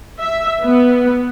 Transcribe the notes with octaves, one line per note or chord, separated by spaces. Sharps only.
E5
B3